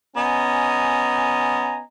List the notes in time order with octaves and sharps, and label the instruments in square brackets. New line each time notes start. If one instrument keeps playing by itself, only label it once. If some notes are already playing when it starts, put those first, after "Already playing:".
[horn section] B3 C#4 D#5 G#5 A#5